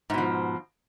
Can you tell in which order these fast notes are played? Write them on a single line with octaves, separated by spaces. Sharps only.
G#2 B2 F3